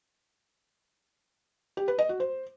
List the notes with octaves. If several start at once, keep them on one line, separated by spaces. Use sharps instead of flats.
G4
B4
D#5
F#4
C5